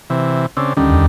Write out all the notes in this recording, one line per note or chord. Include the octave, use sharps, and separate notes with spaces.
C3 E3
C#3 C4 D4 E6
D2 D3 D#3 G3 C#4
E2